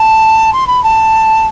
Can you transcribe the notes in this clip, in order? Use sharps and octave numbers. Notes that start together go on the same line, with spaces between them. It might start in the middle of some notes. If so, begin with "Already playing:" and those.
Already playing: A5
C6
B5
A5